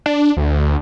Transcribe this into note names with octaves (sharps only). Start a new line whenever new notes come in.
D4
D2